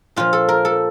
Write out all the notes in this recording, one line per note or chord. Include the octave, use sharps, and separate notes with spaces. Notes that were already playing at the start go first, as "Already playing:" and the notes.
A#2 F3 F4
A4
A#4
A4